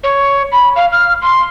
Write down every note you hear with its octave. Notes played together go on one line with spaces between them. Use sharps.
C#5
B5
F5
F6
C6